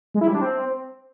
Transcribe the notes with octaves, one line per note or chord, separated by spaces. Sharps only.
G#3
E4
G3
D4
C4